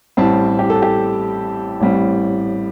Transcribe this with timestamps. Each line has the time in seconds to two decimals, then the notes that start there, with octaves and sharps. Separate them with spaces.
0.17 A1 A2 G3 C4 A5
0.59 G4
0.70 A4
0.82 G4
1.80 A1 A2 G3 C4